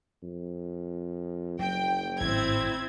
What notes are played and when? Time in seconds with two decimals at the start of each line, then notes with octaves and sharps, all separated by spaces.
0.22 F2
1.59 F#1 F#3 G5
2.20 G#1 A2 C4 E4 G#6